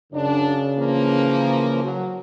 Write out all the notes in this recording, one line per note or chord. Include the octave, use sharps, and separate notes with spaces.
F#2 C#3 D4
E3 F3 A#3
F#3